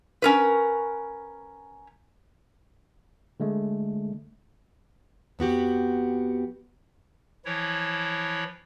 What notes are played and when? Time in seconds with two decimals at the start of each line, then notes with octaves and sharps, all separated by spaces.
0.22 C#4 A#4 B4
3.40 D3 G#3 A3
5.39 F2 B3 F#4 G4
7.45 E3 F3 E4 C#5